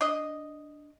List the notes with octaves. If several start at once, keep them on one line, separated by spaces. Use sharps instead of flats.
D4 D#5